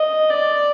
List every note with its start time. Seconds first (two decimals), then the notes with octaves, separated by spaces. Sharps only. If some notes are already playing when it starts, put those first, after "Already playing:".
Already playing: D#5
0.30 D5